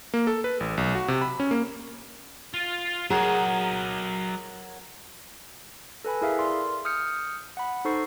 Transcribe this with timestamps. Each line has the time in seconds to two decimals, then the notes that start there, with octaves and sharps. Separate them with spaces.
0.14 A#3
0.27 A4
0.44 B4
0.60 A1
0.77 B1
0.95 F#4
1.08 C3
1.21 B5
1.40 C#4
1.51 A#3
2.54 F4
3.10 F#3 F#4 G#4 A#4 C#5 D#5
6.05 A4 B4 G#5 B5
6.21 E4 G#4 A#4 E5 F5
6.38 A#4 D5 C6
6.85 D#6 F6 G6 C#7
7.57 F#5 B5
7.85 D#4 A4 C5 C#6 C7